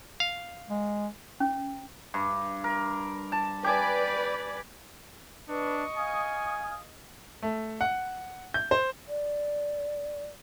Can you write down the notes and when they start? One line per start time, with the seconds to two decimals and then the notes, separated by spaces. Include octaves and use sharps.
0.20 F5
0.70 G#3
1.40 C#4
2.14 G2
2.64 A#4
3.32 A5
3.64 G4 B4 D5 G#5 B5
5.49 D4 B4 D#5 C#6
5.97 F5 G#5 D#6 F6
7.43 A3
7.81 F#5
8.54 G6
8.71 C5
9.08 D5